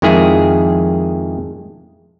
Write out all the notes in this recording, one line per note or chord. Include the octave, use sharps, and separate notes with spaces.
F2 D#3 G#3 E4 G#4